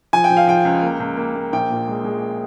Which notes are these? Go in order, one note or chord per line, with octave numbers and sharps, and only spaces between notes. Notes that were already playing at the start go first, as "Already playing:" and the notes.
F3 G#5
G5
F3
F5
F3 G5
C#2
A#3
C#2
A#3
A#3
A#1 G5
A#2
G#3
G#3